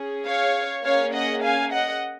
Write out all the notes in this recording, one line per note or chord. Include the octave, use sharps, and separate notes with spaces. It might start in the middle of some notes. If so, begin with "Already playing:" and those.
Already playing: C#4 G#4
C#5 F5
A#3 C#4 G#4 C#5 F5
D#5 F#5
F5 G#5
D#5 F#5